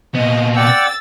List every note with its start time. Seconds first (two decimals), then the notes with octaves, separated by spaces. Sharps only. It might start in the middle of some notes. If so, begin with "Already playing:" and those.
0.15 A#2 B3 D#5
0.56 D5 F#5 G5 E6 A6